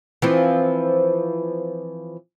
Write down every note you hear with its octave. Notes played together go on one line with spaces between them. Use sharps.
E3 F3 C4